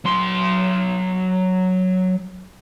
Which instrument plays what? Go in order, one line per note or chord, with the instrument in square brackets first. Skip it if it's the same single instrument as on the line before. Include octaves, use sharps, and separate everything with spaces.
[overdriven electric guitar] F#3 C6